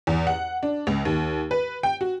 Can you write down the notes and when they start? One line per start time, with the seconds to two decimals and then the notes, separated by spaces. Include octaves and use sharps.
0.07 E2
0.27 F#5
0.63 D4
0.87 C#2
1.05 D#2
1.51 B4
1.83 G5
2.01 F#4